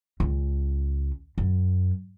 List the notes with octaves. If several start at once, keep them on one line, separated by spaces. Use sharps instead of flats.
C#2
F#2